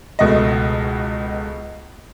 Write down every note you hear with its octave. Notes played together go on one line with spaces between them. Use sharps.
C#2 B2 A3 D#5